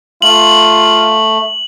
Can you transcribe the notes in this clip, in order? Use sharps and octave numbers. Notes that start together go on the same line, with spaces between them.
A3 F4 F#7